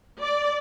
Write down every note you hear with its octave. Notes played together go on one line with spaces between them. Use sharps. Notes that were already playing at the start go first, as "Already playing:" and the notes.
D5